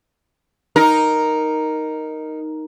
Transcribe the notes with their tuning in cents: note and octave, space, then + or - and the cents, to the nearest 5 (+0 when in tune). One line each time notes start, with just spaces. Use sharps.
D#4 +0 A#4 +0